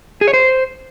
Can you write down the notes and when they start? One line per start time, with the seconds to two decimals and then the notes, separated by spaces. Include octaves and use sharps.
0.21 G#4
0.27 C#5
0.33 C5